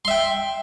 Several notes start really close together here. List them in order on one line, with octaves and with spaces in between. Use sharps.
C6 E5 G5